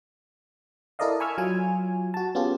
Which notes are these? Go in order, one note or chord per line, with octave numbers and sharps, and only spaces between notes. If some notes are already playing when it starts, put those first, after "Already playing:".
E4 A4 A#4 D5 D#5 F5
G#5 B5 C#6 E6 F6 G#6
F#3 F4 G#5
F#4 A5
B3 C#4 F4 G4 G#4